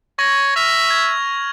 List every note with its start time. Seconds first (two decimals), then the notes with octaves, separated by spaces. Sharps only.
0.19 C#5 C#6 A#6 F#7
0.56 E5 F6 F7
0.90 G#6 F7